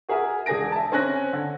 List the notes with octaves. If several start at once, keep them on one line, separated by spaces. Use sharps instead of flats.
F#4 G#4 A#4 E5 G#5
E1 G#4 G#5 A#6 D7
E5 A5
C4 C#4 G#5 F#6 A#6
D3